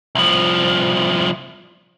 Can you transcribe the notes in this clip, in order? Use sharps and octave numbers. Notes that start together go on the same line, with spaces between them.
C2 F3